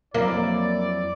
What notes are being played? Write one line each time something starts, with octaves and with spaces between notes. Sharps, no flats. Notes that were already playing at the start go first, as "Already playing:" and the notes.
F2 F#3 A#3 E4 D5